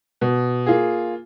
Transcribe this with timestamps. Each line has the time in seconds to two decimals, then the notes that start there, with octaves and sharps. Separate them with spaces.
0.21 B2
0.66 A#3 F4 G#4